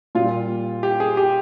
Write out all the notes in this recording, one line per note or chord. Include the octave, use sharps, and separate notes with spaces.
A#2 G3 F4
G4
G#4
G4